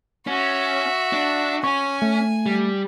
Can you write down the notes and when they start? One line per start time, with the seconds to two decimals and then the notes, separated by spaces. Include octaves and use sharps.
0.27 C#4 F#4 E5
1.13 D4
1.64 C#4 G#5 C#6
2.02 A3
2.46 G3